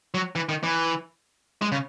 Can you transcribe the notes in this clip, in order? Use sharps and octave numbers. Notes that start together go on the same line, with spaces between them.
F#3
E3
D#3
E3
G#3
C#3